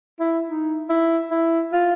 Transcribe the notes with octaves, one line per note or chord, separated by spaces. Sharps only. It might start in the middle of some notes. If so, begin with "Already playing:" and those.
E4
D#4
E4
E4
F4